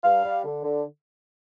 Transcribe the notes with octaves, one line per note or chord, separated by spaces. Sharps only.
G2 F5
G3
D3
D3